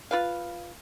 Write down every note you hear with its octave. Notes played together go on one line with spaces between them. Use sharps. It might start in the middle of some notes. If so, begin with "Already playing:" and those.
F4 B4 F5